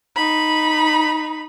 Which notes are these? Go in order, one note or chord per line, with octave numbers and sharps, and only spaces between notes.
D#4 B5